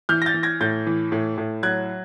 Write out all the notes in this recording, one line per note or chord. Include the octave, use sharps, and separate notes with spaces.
E3 F6 G6
A#6
G6 A6
E3
G#6 A#6
A2 G6 A6
E3
A2
A2
F#3 F#6 G#6